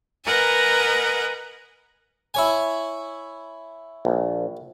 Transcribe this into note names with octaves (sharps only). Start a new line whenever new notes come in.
A#4 B4 D#5 F#5 G#5 A#5
E4 C#5 G#5
A#1